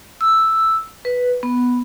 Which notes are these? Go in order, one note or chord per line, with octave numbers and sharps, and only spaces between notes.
E6
B4
B3